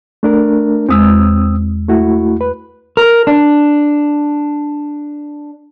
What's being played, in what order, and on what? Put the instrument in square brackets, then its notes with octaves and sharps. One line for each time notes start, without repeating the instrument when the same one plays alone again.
[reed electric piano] A3 D4 A#4
[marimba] E2 G#3 [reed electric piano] C4 D#6 E6
[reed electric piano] A3 E4 F#4
B4
[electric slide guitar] A#4
D4